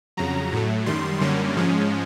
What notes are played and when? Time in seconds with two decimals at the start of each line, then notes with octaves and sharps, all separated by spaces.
0.17 F2 C#3 F#3 A#5
0.52 A2 F#3 A3
0.86 F#2 D#3 G3 C6
1.21 F#2 D3 G3 A#3 C#4
1.56 G#2 F3 G#3 C#4